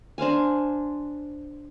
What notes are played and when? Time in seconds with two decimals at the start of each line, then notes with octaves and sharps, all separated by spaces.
0.18 D4 C5 F5 G#5